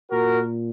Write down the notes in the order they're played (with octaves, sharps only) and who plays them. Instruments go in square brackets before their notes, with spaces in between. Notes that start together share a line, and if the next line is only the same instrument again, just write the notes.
[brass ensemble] A#2 F#4 A#4